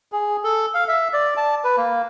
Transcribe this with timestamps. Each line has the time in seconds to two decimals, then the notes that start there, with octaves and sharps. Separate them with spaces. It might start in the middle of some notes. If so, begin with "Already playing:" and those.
0.12 G#4
0.44 A4
0.74 F5
0.88 E5
1.13 D5
1.37 A5
1.64 B4
1.77 A#3